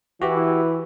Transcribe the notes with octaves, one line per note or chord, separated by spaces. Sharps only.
E3 F#4 G4